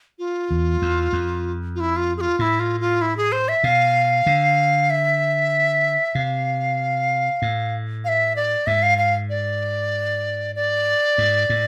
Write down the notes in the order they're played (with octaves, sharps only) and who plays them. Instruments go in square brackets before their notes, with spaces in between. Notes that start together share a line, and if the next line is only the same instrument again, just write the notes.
[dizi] F4
[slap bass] E2
E2
F2
[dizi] F4
E4
F4
G#4
F4
[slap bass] A2 [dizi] E4 F4
[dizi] F4
F4
E4
G#4
C5
E5
[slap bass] B2 [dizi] F5
[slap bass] D3
[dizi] E5
[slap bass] C3 [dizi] F5
[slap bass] A2
[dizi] F5
E5
D5
[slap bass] G#2 [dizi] E5
[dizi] F5
F5
D5
D5
[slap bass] G#2
A2